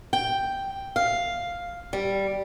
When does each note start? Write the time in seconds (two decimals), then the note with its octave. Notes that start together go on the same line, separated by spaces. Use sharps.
0.13 G5
0.96 F5
1.93 G3